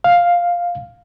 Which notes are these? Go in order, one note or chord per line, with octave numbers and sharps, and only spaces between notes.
F5